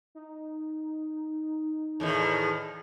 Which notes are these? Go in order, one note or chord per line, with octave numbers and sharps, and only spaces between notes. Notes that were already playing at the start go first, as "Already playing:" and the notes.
D#4
E2 A2 D#3